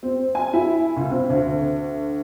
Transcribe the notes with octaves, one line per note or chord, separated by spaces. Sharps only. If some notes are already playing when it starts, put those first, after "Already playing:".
C4
G#5
E4
C#2
C4
D2